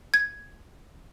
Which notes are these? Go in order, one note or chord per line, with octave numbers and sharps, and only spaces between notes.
G#6